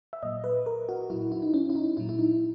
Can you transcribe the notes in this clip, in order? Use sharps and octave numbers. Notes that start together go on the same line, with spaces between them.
E5
A#2 F#3 D#5
B4
A#4
F#4
A#2 F#3 E4
E4
D#4
C#4
E4
D#4
A#2 F#3 E4
E4
D#4